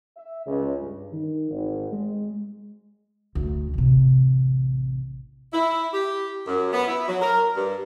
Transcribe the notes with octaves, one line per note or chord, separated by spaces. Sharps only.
E5
C#2
G2
D#3
G#1
G#3
D2
A1 C3
E4
G4
F#2
B3
E4
F#3
A#4
G2